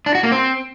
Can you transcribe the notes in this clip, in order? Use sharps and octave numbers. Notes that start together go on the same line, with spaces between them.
D4
F#4
A#3
C4